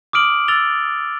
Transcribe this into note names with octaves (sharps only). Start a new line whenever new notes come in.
D6 D#6 F6 D7 F#7
E6 A6 F7 G7